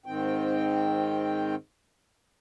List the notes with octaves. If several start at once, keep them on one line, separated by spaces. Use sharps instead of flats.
G#2 D#3 C4 G5